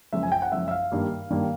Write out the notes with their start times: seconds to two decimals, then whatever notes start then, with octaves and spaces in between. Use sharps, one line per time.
0.13 F#2 C#3 F3 E5
0.23 G#5
0.32 G5
0.42 F#5
0.52 F#2 C#3 F3 E5
0.68 E5
0.71 F5
0.92 G2 D#3 G3 A#3
1.30 G2 D#3 G3 A#3